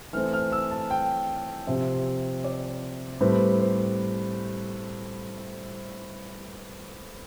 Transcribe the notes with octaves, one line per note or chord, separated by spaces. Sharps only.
E3 A3 C4 F6
F6
E6
A5
G5
C3 F3 C4 E5
D5
A2 G3 C4 B4
C5